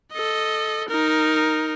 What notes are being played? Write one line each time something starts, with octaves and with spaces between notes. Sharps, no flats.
A4 D#5
D#4 A#4